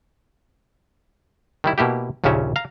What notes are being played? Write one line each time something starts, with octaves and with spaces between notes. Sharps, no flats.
D#3 G3 E4
B2 A#3 E4 G4
A#1 D#2 A#2 C#3 C#4 E5
F5 A#5